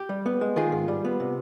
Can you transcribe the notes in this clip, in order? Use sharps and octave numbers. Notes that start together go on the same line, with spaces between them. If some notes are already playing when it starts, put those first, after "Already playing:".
Already playing: G4
G3
B3
G#3
D#3 F4 G#4
G#2
G3
B3
C3